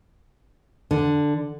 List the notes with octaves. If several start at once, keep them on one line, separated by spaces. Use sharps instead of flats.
D3